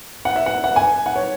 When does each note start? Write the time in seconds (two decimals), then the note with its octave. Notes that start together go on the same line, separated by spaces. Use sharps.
0.25 F#5
0.36 E5
0.46 F#5
0.64 F#5
0.76 G#5
1.06 F#5
1.16 C#5